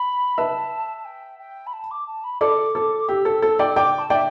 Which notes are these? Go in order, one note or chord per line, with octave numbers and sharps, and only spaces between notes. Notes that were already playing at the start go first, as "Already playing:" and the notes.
Already playing: B5
B4 E5 A5
A5
G5
G5
B5
A5
D6
A5
B5
A4 D5 D6
A4
G4 E6
A4
A4
D5 G5
D5 G5 D6
A5
D5 E5 G5